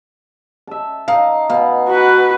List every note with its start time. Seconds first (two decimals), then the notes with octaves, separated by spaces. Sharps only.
0.67 E5 A5
1.08 D#4 F5
1.50 B2 F5 B5
1.88 F#4 B4